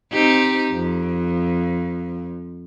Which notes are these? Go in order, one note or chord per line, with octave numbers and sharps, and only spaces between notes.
C4 D#4 G4
F2